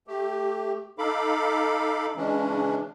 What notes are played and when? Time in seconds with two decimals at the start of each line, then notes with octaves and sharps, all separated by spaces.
0.07 A3 G4
0.98 D#4 A4 F5 B5 D6
2.16 C#3 E3 G#3 C#4 D4